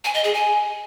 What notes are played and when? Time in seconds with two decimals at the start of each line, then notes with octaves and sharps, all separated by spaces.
0.05 G#5
0.14 D#5
0.24 G#4
0.34 G#5